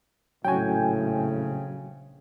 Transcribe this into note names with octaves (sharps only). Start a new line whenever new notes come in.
A#1 A2 C#3 F#3 C#4 F#4 G5 G#5